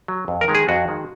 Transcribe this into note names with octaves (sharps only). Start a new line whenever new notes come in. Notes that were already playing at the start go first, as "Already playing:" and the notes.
F#3
F2
A#4
D#3 G#3
G#4
F2 F#4
D#3 G#3